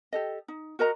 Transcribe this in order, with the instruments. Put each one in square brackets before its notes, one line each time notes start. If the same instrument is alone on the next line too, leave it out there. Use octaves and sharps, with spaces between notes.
[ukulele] G4 A4 D#5
D#4
F#4 A#4 D#5 A#5